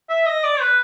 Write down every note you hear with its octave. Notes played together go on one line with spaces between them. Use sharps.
E5
D#5
D5
B4